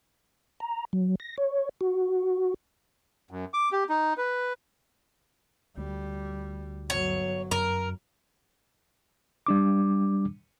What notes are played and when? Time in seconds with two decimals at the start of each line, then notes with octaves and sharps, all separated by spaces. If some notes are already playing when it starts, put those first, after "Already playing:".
0.60 A#5
0.93 F#3
1.20 A#6
1.38 C#5
1.81 F#4
3.31 F#2
3.54 D6
3.72 G4
3.89 D#4
4.18 B4
5.77 D2 G3
6.90 G1 F#3 C#5
7.51 F#2 A#4
9.46 G3 D4 D6